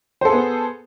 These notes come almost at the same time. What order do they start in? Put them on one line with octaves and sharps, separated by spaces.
C5 A4 G#4 B3